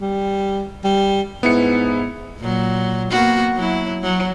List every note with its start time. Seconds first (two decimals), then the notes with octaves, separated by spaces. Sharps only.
0.01 G3
0.84 G3
1.43 G#2 B3 E4 C#7
2.39 A#2 F#3
3.10 A#3 B3 F#4
3.56 F#3 E4
4.03 F#3